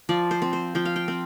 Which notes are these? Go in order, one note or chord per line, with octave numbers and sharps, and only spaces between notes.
F3 D5
C5
C4
C5
F3 G5
F5
G5
C4